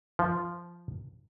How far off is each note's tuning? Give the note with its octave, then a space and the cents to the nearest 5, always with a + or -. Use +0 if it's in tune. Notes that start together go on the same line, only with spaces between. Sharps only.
F3 -10